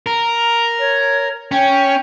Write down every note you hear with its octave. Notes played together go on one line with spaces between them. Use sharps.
A#4
C#5
C#4 G5